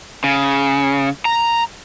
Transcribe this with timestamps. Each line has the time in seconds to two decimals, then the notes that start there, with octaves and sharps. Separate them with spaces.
0.24 C#3
1.25 A#5